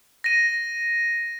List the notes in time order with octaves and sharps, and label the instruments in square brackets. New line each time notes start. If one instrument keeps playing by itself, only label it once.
[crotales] A#6 D#7